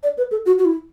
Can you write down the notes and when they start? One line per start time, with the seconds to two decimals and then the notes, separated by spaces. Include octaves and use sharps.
0.03 D5
0.18 B4
0.31 A4
0.46 F#4
0.58 F#4
0.65 E4